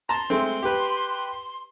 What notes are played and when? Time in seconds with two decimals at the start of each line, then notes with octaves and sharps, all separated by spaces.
0.09 A5 A#5 C6
0.30 G#3 A3 C4
0.63 G4 B4